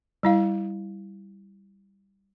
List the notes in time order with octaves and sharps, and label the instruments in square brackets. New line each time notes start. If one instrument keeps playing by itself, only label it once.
[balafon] G3 E4 F5